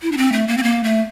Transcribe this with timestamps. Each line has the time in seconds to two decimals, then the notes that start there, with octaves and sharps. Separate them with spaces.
0.02 E4
0.12 D4
0.17 C4
0.33 A3
0.48 A#3
0.57 C4
0.63 A#3
0.84 A3